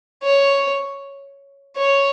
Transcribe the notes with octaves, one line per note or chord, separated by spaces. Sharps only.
C#5
C#5